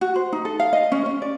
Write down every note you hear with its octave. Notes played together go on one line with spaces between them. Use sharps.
F#4
C5
D#4
A4
F5
D#5
C#4
C#4
D5